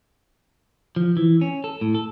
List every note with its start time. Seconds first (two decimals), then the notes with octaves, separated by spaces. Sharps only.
0.96 F3
1.17 E3
1.41 C#4
1.64 A4
1.81 A2
1.95 A4